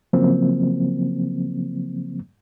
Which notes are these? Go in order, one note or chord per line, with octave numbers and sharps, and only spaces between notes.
C#3 F3 F#3 A#3 C4